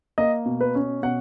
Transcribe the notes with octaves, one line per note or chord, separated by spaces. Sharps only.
A#3 D#5
B2
B4
C#4
B2 F#5